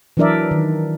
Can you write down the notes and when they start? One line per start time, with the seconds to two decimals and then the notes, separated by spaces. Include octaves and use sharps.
0.17 E3 F#3 D4 A#4 D5 E5
0.51 D#3